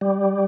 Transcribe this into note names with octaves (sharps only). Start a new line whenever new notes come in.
G3